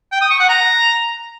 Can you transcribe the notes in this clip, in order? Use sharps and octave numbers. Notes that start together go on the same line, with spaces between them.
G5
D#6
C#6
F#5
A#5